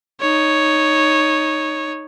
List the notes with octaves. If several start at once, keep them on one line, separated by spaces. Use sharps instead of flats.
D#4 C#5